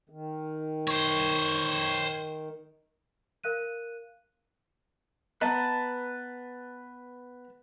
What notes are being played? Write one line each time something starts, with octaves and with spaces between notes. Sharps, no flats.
D#3
C5 C#5
A#4 F5 F#6 D#7
B3 B4 D#5 A5 A#5